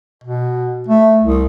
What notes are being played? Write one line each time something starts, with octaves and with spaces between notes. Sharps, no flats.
B2
A3
C2